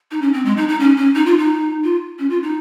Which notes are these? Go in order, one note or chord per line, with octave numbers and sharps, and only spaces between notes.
D#4
C#4
C4
G#3
D#4
D#4
C#4
C#4
D#4
F4
D#4
F4
C#4
F4
D#4